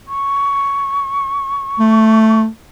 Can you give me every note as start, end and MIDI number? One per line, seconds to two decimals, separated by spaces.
0.08 2.41 85
1.79 2.46 57